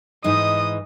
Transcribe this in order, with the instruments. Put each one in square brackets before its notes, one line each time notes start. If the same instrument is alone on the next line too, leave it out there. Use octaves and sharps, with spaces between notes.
[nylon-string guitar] G#2 E3 D#4 [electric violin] D#5 D#6